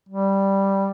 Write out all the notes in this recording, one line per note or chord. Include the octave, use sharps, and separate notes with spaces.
G3